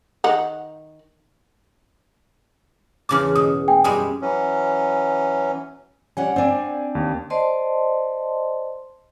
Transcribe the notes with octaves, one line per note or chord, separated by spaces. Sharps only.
D#3 F#5 A#5
E2 C#3 A5 D6 F6
B2 D#6
G5 G#5
F#2 G3 G#3 D#6
E3 F#3 C#4
G3 C#4 F#5 G#5
C4 D4 D5 G#5
D#2
C5 D5 D#5 A5 C6